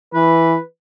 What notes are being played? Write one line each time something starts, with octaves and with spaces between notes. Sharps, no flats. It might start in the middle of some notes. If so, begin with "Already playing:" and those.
E3 B4